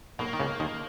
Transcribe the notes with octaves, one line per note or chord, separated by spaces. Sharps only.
B1 B2 A#3
D#3
C#2 C#3
D#2 D#3